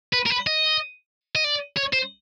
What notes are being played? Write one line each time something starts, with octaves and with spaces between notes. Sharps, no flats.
B4
A#4
B4
D#5
D#5
D5
C#5
C5